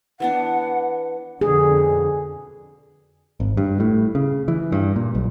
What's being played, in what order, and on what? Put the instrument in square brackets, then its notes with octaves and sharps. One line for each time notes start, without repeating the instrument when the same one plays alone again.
[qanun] E3 B3 D4 [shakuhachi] F#5
[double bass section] F2 B2 D3 [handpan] G#4
[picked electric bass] G#1
G2
A2
C#3
E3
G2
A#2
B1